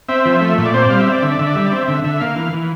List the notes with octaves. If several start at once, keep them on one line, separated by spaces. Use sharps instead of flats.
C4 E5
F3
A3
A#2 E5
D5
C4 C5
D5
G3 F5
E5
C4
D5
D3 E5
D5
D3 E5
D5
G3 E5
D5
C4 E5
D3 E5
D3 E5
A#3 F5
E3
E3